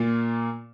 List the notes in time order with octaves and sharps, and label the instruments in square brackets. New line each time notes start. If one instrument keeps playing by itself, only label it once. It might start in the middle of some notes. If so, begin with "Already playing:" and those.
Already playing: [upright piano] A#2 A#3 F4